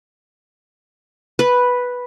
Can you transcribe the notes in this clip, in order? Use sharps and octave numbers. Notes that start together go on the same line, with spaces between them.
B4